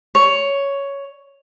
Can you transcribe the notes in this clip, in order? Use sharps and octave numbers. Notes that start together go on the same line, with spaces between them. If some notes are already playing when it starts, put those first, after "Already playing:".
C#5